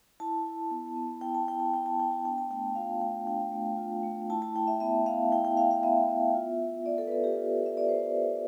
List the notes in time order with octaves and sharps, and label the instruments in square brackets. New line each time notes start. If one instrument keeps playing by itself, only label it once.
[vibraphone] E4 A5
E4
B3
B3
E4 G5
A5
E4 G5
A5
B3 G5
A5
B3 G5
A5
D4 G5
A5
A3 G5
F4 F5
A3 G5
D4 G5
A3
F4
A3
E4 A5
A5
E4 G5
E5
B3 E5
B3 F5
E4 G5
G5
E4 F5
F5
B3 E5
B3
F4
F4
B3 D5
A4
B4
B3 A4
G4
F4
F4 E5
D5
B3 C5
B3